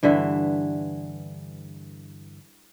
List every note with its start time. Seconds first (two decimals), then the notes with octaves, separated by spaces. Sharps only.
0.03 G2 D3 E3 E5